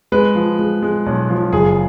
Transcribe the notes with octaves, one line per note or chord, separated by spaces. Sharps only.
G#3 B4
F3
G#3
G#3
B1
F3
F#1 G#4